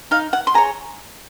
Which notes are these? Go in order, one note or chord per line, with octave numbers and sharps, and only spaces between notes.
D#4 F5
F#5
C6
G#4 C#5 A#5